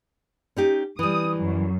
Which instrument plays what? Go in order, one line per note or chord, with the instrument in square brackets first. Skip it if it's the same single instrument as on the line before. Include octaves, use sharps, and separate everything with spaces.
[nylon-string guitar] C#4 D#4 G4
[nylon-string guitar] E3 G3 [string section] D#6
[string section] F#2